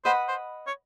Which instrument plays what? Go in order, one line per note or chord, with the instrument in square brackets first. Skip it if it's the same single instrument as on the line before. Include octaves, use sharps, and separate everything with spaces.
[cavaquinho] B4 D#5 F#5 B5 [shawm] C5
[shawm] C5
C#5